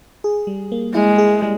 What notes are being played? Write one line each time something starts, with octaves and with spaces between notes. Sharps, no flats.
G#4
G3
A#3
G#3 E4
G#4
G3